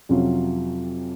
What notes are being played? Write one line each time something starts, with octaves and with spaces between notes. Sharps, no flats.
F2 C3 F#3 C#4 F4